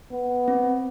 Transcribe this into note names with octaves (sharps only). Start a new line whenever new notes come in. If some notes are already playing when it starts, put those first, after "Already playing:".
B3
C4